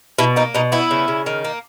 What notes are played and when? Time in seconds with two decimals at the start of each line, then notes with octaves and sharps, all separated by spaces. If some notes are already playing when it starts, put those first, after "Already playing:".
0.19 B2 E4
0.36 A#3 D#4
0.55 B2 D#4
0.72 B3 E4
0.91 C#3
1.08 C#3
1.26 D#3
1.44 A#3